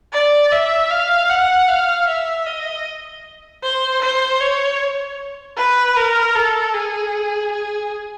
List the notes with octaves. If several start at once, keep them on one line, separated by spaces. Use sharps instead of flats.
D5
E5
F5
F#5
F5
E5
D#5
C5
C5
C#5
B4
A#4
A4
G#4
G#4